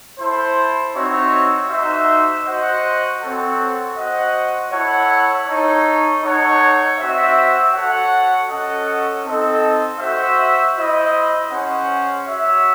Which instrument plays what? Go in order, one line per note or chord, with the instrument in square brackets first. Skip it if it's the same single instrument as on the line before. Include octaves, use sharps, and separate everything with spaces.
[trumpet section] E4 A4 C5
C4 D#4 F#4 C#5 E5
D#4 F#4 C5 E5
F#4 C5 D#5 F#5
C4 F#4 A4 C#5 F#5
F#4 C5 D#5 F#5
E4 A4 C#5 F#5
D#4 A4 C#5
D#4 A4 C#5 F#5
C4 F#4 C5 E5
F#4 A4 C#5 F#5
C#4 F#4 A4 D#5 F#5
C4 D#4 A4 D#5
F#4 C5 E5
E4 C5 D#5
C#4 G#4 C5 F#5
F#4 C#5 E5